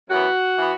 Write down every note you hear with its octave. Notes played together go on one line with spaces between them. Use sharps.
F#2 E3 B3 F#4
E3 B3